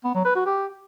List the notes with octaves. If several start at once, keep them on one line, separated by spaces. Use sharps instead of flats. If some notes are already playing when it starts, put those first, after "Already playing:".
B3
F#3
B4
F#4
G4